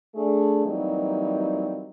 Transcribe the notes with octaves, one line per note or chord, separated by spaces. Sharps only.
A3 D4 G#4
E3 F#3 G3 A#3 C4 D#4